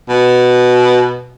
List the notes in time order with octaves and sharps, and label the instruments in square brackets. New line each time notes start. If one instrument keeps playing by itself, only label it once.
[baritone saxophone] B2